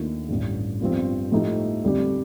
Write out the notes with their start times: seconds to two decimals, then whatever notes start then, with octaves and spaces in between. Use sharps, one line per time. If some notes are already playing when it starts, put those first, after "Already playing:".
Already playing: D#2 D#3 A3 D4 F4
0.29 A1 G2 D3
0.81 G1 G2 F3 C4
1.32 A2 F3 A3 D#4 G4
1.83 F2 D3 G3 D4 G4